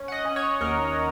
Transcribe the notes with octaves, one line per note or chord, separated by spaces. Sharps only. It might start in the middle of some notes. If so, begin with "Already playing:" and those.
Already playing: C#4
F#5
D#5
C#4
C#5
D#2 A#4